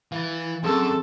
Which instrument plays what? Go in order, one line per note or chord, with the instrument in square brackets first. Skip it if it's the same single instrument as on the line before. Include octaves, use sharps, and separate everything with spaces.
[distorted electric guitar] E3 [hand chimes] F5 A6
[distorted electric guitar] F#2 [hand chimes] C4 G#4 C6 [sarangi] A4